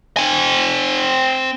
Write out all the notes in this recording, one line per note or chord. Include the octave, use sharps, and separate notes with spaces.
C4 G#5